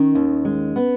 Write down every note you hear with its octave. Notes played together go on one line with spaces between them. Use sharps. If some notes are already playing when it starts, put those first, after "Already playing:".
Already playing: D#3 C#4
D#2
G#3
B3